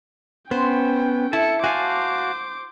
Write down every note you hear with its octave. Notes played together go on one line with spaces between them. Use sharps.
B3 C#4 C5 G5
E4 A4 A5 C#7
F#4 C5 F5 G#5 A5 D6